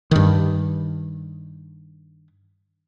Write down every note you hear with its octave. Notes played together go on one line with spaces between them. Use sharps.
G2 D#3